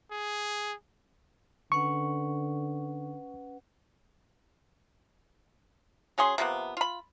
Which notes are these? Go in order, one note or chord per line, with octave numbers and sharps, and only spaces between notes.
G#4
D3 C#4 B4 F#5 C#6
F#3 C#4 G#4 C6
C3 F3 A#3 B3
F4 B5